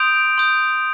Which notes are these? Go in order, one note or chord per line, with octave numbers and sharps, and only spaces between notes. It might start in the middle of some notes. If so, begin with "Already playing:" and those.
Already playing: C6 D#6 G6 D7 F7
C6 D#6 G6